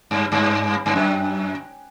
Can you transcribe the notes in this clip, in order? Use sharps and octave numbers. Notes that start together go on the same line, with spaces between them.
G2
G2
G2
F#2